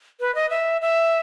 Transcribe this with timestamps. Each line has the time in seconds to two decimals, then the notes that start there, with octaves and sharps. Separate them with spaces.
0.20 B4
0.35 D#5
0.50 E5
0.82 E5